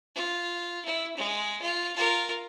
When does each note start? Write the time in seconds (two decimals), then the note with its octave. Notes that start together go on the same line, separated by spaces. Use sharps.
0.16 F4
0.85 E4
1.17 G#3
1.62 F4
1.96 F4 A#4